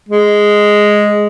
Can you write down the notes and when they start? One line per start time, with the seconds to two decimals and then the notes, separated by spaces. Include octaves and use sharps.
0.09 G#3